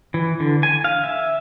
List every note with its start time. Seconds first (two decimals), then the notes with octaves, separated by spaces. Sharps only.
0.14 E3
0.40 D3
0.63 G#5
0.84 F5
1.04 E5